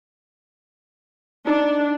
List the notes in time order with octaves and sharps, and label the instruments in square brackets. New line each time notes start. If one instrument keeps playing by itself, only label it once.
[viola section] D4 [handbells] D#4